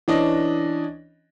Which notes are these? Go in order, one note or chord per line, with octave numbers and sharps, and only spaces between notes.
E3 C#4 D4 D#5 A#6